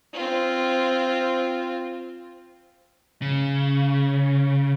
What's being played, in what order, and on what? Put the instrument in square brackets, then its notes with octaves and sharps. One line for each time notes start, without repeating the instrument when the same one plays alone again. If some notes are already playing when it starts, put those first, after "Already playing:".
[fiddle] C4 F4
[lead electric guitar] C#3